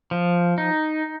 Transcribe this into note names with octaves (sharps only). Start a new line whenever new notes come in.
F3
D#4